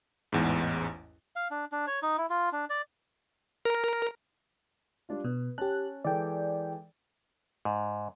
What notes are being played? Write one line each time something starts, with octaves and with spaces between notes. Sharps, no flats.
A1 E2 G#2
F5
D4
D4
C#5
D#4
E4
F4
D4
D5
A#4
G3 D4 F4
B2 B4
C#4 G4 A5 F#6
E3 G#3 A4 D5 G5
G#2